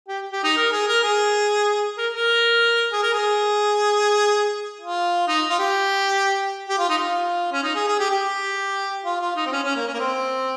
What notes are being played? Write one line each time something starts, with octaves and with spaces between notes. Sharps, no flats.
G4
G4
D#4
A#4
G#4
A#4
G#4
A#4
A#4
G#4
A#4
G#4
F4
D#4
F4
G4
G4
F4
D#4
F4
C#4
D#4
G#4
G#4
G4
G4
F4
F4
D#4
C4
C#4
C#4
A#3
C#4
A#3
C4